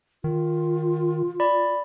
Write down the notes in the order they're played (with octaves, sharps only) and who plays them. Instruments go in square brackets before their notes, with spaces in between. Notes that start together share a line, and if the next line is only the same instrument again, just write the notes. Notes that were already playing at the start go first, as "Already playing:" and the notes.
[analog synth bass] D#3 [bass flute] F4
[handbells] D5 B5